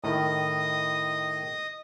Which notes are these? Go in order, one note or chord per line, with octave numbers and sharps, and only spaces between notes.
A2 D#3 D#5 D#6